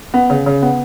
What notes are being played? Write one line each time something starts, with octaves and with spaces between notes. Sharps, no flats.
B3
C#3
C#3
B3